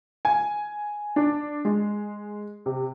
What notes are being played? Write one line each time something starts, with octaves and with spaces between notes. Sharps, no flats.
G#5
D4
G#3
C3